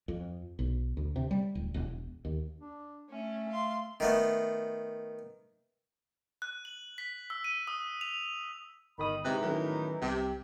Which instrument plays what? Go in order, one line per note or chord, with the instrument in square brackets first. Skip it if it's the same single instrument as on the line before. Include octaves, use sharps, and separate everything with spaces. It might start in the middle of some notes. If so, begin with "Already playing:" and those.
[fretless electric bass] F2
B1
D2
C3
G3
D1
E1
D#2
[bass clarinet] D4
[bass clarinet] A3 [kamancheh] C#4
[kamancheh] F5 C6
[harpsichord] D#3 A3 B3
[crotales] F#6
F#7
B6
E6
D#7
D#6
F7
[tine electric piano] G1 D#6 [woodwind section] D#3 B5
[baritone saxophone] C3 [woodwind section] E3 D#4 [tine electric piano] G#3 F#6
[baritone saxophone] A2 [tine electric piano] D#3 F#3 C#4
[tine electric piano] C2 G4 G5 [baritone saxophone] C3